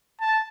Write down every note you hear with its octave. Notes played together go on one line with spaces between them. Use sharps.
A5